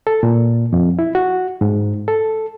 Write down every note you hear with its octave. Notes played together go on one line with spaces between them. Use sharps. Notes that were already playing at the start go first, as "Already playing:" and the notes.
A4
A#2
F2
E4
F#4
G#2
A4